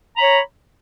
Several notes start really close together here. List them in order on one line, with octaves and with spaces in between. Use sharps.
A#5 B5 C#5